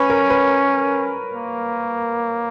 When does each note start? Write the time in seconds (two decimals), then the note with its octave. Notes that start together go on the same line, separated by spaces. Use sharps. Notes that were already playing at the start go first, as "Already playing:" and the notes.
Already playing: C#4 B4 C#5
0.10 A#4
0.30 B4
1.34 A#3